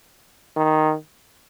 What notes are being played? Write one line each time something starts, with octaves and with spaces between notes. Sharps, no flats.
D#3